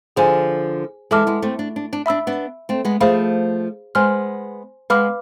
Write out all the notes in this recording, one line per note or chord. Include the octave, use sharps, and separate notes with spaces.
D3 F3 G#4 C5 G#5
E3 G#3 A4 E5 A5 D6 F6
G#3 B3
A3 C4
D4
D4
D4
D4 E5 B5 E6
B3 D4
A3 C4
G#3 B3
F3 A3 G#4 C5 F5 B5
G#3 B3 C5 G#5 C6 F6
G#3 B3 B4 F5 B5 D6 F6